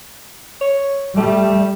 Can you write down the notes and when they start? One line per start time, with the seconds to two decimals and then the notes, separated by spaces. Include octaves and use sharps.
0.61 C#5
1.17 G3 A3